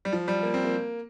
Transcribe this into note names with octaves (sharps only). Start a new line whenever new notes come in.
G3
F3
G3
A#3
C4
A#3